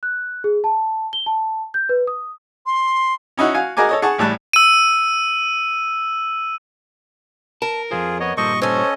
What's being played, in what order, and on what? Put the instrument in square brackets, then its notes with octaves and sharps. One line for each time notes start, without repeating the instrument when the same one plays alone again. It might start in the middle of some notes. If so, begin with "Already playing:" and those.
[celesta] F#6
G#4
A5
G7
A5
G6
B4
D#6
[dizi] C6
[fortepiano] C#4 D#4 E4 F#4
F#4 F5 G#5
F#4 G#4 A#4 D#5 G#5 D6
A4 C#5 D#5
G#4 F#5 A5 C#6
A1 A2 G3 A5 F#6
[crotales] E6 D#7
[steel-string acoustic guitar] A#4 [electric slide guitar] A5
[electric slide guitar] F2 D#3 C5 [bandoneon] F4 G#4
[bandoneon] B3 C#5 D#5
[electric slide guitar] G2 A#2 G3 [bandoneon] A4 C5 [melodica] D#5 C#6
[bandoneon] C#4 D#5 [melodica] A4 C#5 [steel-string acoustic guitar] C5 G#5